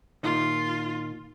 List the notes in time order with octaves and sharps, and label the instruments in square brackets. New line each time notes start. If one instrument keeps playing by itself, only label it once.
[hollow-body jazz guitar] A#2 D#3 [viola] F4